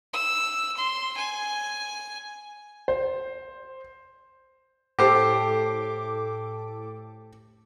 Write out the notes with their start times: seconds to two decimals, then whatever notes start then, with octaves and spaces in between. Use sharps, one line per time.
0.13 E6
0.77 C6
1.17 G#5
2.88 C5
4.99 A2 G4 A4 C5 D6